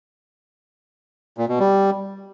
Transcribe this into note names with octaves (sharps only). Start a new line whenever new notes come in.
A#2
B2
G3